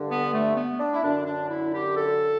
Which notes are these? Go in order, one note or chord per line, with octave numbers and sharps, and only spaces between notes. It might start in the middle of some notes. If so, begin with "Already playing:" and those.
Already playing: G2 D3
B3
A3
B3
D4
E4
F#2 D3 D4
D4
E4
G4
A4